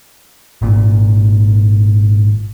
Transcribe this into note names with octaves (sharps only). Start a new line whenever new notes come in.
G#1 A#2